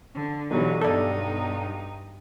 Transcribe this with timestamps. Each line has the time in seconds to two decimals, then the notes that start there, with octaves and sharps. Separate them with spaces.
0.13 D3
0.51 B1 E3 F#3 G3 D#4
0.81 G2 D#4 A4 D5